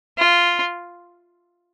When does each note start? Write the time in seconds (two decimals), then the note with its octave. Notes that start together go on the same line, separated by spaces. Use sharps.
0.18 F4